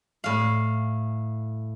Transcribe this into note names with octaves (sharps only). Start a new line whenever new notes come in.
A2 F5